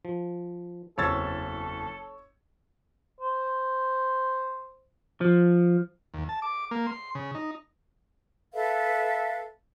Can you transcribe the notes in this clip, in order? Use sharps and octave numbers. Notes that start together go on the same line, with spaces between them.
F3
F#1 E2 C4 A4 C#5 E6 G#6 A6
C5
F3
D#2
A5
D6
A#3
C6
C#3
D#4
A4 B4 E5 F5